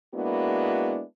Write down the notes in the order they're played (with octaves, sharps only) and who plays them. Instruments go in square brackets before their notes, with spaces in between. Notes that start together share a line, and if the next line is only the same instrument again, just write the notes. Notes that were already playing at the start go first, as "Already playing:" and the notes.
[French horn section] G#3 A#3 B3 D4 E4 F#4